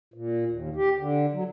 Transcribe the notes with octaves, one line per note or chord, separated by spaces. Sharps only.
A#2
D#2
G4
D3
F#3